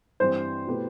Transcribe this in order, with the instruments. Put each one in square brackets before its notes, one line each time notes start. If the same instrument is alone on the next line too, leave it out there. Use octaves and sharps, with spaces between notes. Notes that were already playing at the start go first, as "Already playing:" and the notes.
[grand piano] G2 E3 G3 C4 G4 [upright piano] C5
[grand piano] B2 A3 E4 G4 B4